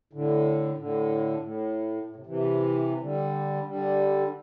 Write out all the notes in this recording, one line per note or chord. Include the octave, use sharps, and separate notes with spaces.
A2 D3
A2 D3
A2
A2
C3
C3 E3
D3 G3
D3 G3